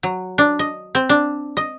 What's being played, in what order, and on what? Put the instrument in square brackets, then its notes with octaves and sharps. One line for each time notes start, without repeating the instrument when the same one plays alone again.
[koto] F#3
D4
D#5
C4
D4
D#5